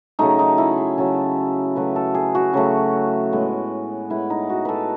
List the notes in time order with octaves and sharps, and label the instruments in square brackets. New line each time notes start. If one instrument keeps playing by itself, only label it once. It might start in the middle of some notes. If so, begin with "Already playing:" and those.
[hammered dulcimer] C#3 F#3 A3 D#4
D#4
E4
G#4
C#3 F#3 A3 A4
C#3 F#3 A3 B4
A4
G#4
F#4
C#3 F#3 A3
A2 G#3 B3
A2 G#3 B3 E4
D#4
F#4
A4 B4